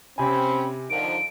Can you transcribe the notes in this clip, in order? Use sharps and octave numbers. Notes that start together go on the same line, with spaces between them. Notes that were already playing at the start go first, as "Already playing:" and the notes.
C3 C4 C#4 G#5 B5
D3 D#3 F3 D7